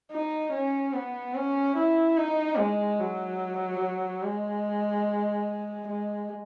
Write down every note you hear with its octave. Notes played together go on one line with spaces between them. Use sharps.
D#4
C#4
B3
C#4
E4
D#4
G#3
F#3
G#3
G#3